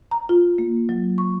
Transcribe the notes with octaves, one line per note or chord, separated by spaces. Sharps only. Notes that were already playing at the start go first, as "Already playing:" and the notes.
A#5
F4
A#3
F#3
C#6